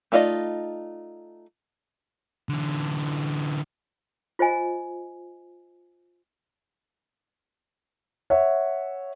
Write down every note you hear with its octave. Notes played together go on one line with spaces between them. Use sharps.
A3 D#4 F4 D5 D#5
D3 E3
F4 C5 D#5 G#5
C#5 E5 F#5